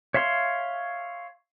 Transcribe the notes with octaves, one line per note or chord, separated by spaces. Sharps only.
C#5 E5 F5 C6